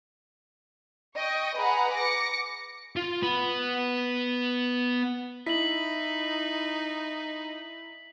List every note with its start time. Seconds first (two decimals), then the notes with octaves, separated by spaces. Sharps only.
1.17 D#5 G5 C#6
1.59 G#4 B4 F#5 A#5 B5
1.94 D6 A#6 C#7
2.97 F4
3.23 B3 B5
5.46 D#4 E4 B6 F#7